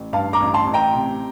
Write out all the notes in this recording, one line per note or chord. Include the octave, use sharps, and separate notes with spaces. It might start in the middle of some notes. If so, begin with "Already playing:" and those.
Already playing: A1
G2 F5 A5
A#5 D6
A1
A5 C6
A1
G5 A#5
C3